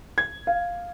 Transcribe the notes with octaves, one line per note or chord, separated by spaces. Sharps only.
G#6
F5